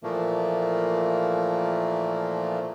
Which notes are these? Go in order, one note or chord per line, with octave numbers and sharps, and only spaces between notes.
A#2 E3 F3 A3 A#3